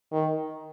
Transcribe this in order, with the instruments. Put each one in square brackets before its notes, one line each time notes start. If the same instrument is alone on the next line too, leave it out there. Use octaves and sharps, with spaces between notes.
[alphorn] D#3